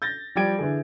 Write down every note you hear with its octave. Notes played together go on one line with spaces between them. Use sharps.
G6 A6 A#6
F3 G3 D5 G5 G#6 D7
D3 E3 G#4